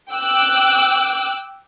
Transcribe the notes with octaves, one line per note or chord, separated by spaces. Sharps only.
G5 D6 E6 F#6